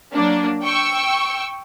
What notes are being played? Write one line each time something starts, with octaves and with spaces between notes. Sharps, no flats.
F#3 A#3 D4
G5 C#6 E6